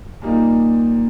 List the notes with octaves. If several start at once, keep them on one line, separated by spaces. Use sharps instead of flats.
A#2 G3 A#3 D#4